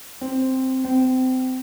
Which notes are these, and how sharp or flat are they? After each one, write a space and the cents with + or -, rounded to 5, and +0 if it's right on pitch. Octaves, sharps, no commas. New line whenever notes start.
C4 +0
C4 -25